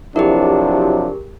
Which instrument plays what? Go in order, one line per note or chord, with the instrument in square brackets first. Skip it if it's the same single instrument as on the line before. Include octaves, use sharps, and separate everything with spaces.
[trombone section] C3 F3 F#3 [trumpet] D4 [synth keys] E4 [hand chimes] G4 G#4 A#4